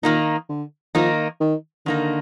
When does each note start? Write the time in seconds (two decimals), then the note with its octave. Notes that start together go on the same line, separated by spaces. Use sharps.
0.03 A#2 D#3 A#3 D#4
0.49 D3
0.95 D#3 F3 A#3 D#4
1.40 D#3
1.86 D3 D#3 A#3 D#4